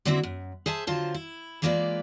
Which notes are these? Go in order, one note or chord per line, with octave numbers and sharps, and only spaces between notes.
D3 A#3 C4 E4 F#4 E5
F#2
G#4 C5 E5 A5
D3 F#3 F4 C5 A5
E4
E3 G#3 A#3 F4 B4 D5